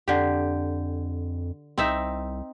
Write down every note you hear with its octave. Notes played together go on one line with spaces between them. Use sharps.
F2 D3 G4
C2 C4 D#4 E5